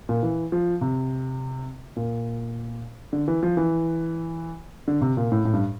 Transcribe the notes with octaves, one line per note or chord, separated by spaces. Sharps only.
A#2
E3
F3
C3
A#2
D3
E3
F3
E3
D3
C3
A#2
A2
A2
G2